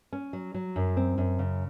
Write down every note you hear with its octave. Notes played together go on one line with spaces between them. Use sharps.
C#4
F#3
F#3
F#2
C4
F#2
C#3